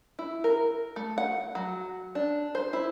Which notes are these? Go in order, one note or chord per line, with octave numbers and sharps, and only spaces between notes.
E4
A#4
A3
F#5
F#3
D4
C5
E4